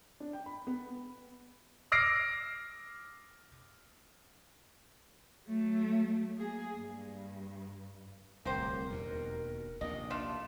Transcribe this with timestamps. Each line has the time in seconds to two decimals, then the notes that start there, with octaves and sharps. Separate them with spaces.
0.20 D4
0.33 G5
0.46 B5
0.67 B3
1.92 D6 E6 F6 A#6 C7 D7
5.47 F#3 A3
6.37 A#3 G#4
6.76 G2
8.45 D1 C2 A#3 G4 A#4 C5
8.89 E1 D#2 B2
9.81 A#1 D#2 C3 D#5
10.10 A3 D4 F4